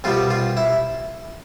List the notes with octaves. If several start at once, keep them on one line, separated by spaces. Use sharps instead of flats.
C2 B2 G3 F4
F4
E4